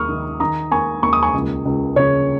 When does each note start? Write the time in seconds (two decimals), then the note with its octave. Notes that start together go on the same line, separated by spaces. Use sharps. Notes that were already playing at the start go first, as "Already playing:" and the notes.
Already playing: D#2 C#6 D#6 F6
0.09 D#3
0.40 D#3 A#5 D#6
0.71 A#3 G#5 C#6
1.03 D#2 C#6
1.13 D#6
1.23 G#5 C#6
1.34 C#2
1.65 C#2
1.96 C#3 C#5